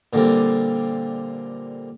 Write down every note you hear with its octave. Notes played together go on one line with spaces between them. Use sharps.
A#2 D3 G3 C4